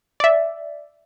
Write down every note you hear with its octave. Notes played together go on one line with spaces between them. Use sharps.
D5 E5